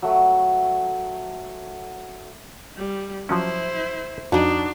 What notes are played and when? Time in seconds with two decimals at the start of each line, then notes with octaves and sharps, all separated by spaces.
0.02 F#3 A3
2.77 G3
3.29 F3 F#3 C#4 E4 C5
4.32 F2 D4 D#4 F#4 G#5